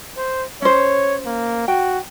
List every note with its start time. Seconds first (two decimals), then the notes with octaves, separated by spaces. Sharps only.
0.18 C5
0.62 C#4 C5 C#5
1.26 A#3
1.68 F#4 G5